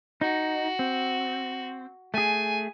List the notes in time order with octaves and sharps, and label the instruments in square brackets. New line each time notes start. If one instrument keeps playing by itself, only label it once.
[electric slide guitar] D#4 [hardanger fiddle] F#4
[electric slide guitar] C4
[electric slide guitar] A3 G#4 [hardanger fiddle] G#5